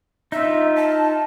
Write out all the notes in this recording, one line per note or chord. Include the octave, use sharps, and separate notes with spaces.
D#4 F4 E5
A5